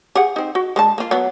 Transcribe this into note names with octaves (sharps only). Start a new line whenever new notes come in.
G4 G#4 F#5
C4 D#4
F#4
G#3 D4 A5
A#3 F4
F#3 B3